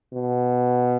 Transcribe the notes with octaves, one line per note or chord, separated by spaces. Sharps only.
B2